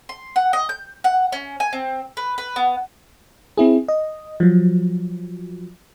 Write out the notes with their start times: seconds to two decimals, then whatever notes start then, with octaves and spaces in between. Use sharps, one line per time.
0.09 C6
0.36 F#5
0.53 D#5
0.69 G6
1.04 F#5
1.32 C#4
1.60 G#5
1.73 C4
2.17 B4
2.38 B4
2.56 B3
3.57 C4 E4 G#4
3.88 D#5
4.40 F3 F#3